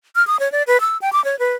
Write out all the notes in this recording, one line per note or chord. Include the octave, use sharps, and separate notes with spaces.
F6
D#6
C#5
D5
B4
E6
G5
D6
C#5
B4